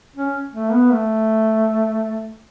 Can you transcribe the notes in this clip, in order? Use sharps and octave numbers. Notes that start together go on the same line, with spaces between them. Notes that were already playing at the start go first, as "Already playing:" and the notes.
C#4
A3
B3
A3